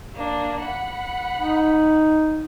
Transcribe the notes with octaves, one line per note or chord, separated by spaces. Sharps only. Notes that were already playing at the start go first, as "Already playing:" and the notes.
A#3 D4
F#5 B5
D#4